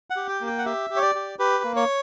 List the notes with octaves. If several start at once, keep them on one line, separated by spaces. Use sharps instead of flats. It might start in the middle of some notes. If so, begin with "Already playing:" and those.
F#5
G4
G5
A#3
G5
F#5
G4 E5
G4
C#5
D5
G4
G4 B4
A#3
C#5